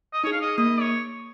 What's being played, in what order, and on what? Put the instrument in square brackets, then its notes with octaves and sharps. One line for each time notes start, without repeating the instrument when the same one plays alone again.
[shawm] D#5
[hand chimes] D#4 G#4 [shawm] C#5
[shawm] F5
D#5
[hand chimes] A#3 [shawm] D#5
[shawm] C#5